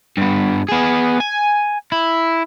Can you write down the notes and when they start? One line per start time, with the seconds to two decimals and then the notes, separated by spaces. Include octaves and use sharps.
0.17 G2 B3
0.69 B3 G#4
1.20 G#5
1.92 E4